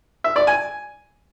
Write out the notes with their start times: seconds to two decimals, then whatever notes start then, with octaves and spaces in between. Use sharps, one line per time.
0.24 E5
0.36 D5
0.47 G#5